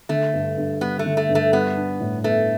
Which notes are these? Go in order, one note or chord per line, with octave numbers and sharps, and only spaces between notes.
D3 A3
G2
G2
G3 B3
A3
D3
A3
G2
A3
G3 B3
D4
A2
A3 B3